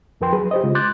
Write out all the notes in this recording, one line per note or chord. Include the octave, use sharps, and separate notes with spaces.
F2 F3 A#4 B4 G5 C6
F#3 G#4 B4
G4 C5 D#5
C#3 G#3 F4
C6 D6 F#6 G6 A6